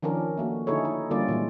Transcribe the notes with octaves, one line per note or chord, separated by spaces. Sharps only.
D#3 F3 C#4 D4 A#4
A3 A#3 F#4
D3 D#4 E4 G#4 A4 C#5
D#4
D3 G3 A#3 C#4 F4 D5
A#2 E3 G#3